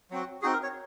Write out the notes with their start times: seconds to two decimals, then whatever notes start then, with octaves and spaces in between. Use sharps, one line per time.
0.11 F#3 C4 F#4
0.42 C4 D#4 F#4 G#4
0.53 A#4
0.63 C#5